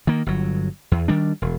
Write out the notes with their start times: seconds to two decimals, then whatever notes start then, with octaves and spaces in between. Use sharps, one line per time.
0.07 D#3 A#3
0.26 G1 F#3
0.91 E2
1.08 D#3 G3 D4
1.42 E1